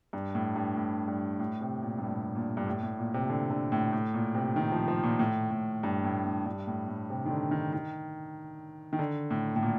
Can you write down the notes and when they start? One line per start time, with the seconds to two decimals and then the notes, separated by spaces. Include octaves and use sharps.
0.13 G2
0.35 A2
0.56 G2
0.76 A2
1.08 G2
1.39 A2
1.61 C3
1.83 A#2
1.98 G2
2.03 A2
2.35 A#2
2.57 G2
2.66 A2
2.83 A2
2.99 A#2
3.14 C3
3.30 D3
3.51 D3
3.72 A2
3.93 A2
4.14 A#2
4.35 C3
4.56 D#3
4.72 F3
4.88 F3
5.03 A#2
5.19 A2
5.51 A2
5.83 G2
6.04 A2
6.25 A2
6.46 G2
6.67 A2
6.88 A2
7.10 C3
7.26 D#3
7.30 D3
7.51 D#3
7.73 D#3
8.93 D#3
8.99 D3
9.31 A2
9.56 A2
9.63 A#2